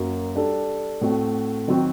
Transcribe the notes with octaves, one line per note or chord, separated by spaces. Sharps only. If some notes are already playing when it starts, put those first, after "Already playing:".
Already playing: F#2 F#3 A#3
G3 D4 A4
A2 A3 C4 F#4
D#3 F#3 C4 F#4